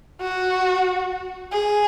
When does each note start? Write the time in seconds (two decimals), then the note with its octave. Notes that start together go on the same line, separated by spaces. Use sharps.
0.21 F#4
1.52 G#4